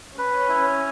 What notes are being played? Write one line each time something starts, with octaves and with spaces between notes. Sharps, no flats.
C#4 B4
E4